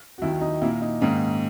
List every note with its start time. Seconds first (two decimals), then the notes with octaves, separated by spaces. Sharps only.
0.18 F#4
0.22 D#2 D#3 F#3 E4
0.41 D#4
0.62 A#2 A#3 E4
0.81 D#4
1.01 G#2 D#3 A#3 C#4